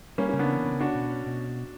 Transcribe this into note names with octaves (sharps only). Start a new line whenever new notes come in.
G3 A#3 C#4
A#3 C#4
C#3
B3 D4
E3
C#3
C#4 D4 F#4
B2
C#4
B2